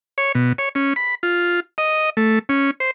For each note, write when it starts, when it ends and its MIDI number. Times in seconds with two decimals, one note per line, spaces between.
0.18 0.32 73
0.35 0.53 47
0.58 0.69 73
0.75 0.93 61
0.96 1.15 83
1.23 1.60 65
1.78 2.10 75
2.17 2.39 57
2.49 2.71 61
2.80 2.91 72